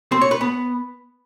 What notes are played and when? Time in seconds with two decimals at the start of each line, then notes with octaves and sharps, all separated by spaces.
0.12 C4
0.21 C#5
0.31 B4
0.41 B3